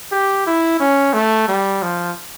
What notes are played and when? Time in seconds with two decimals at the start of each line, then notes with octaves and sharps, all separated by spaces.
0.11 G4
0.47 E4
0.80 C#4
1.13 A3
1.48 G3
1.82 F3